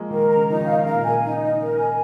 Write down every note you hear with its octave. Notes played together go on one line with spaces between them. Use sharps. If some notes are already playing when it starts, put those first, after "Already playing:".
Already playing: F3 G#3 A#3
D#3 A#4
A#5
C#3
F3 D#4
D#3
F5
C#3 A#4
A#2
C#3 G#5
D#4
D#5
A#4
G#5